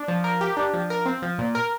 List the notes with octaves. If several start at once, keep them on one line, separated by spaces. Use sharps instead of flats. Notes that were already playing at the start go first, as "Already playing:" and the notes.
Already playing: D4
F3
A#4
G4
D4
F3
A#4
C4
F3
A#2
A#4